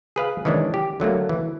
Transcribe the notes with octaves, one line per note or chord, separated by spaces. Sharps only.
G#4 B4 F5
D#3 E3 G#3 C#4 D4
G4
D3 F#3 A3 A#3
E3